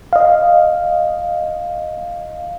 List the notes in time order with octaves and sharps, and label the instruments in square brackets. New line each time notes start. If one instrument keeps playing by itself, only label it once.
[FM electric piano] D#5 F5